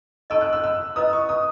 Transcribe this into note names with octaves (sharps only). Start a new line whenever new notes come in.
D#4 A4 D#5 A5 C#6 E6
F#6
E6
E6
E4 B4 D#5 D#6
C#6
D#6